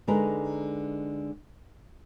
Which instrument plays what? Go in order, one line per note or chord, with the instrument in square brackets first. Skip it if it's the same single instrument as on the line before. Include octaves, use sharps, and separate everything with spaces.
[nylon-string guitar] D3 G#3 D#4 A#4 B4